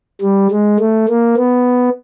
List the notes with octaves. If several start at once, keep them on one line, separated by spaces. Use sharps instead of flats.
G3
G#3
A3
A#3
B3